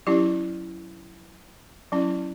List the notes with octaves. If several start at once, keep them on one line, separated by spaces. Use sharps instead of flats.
F#3 C#4 E4 G4
F#3 C#4 E4